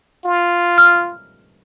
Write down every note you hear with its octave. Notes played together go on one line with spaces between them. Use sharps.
F4
F6